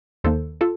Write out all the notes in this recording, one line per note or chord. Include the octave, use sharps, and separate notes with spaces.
D#2 D#3 A#3 A4 C5
F4 A4